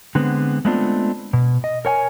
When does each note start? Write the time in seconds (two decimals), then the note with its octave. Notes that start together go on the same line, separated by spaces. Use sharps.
0.15 D3 G#3 B3 C4
0.65 G#3 A3 B3 C4 D4 F4
1.33 B2
1.64 D#5
1.85 A#4 C#5 G5 G#5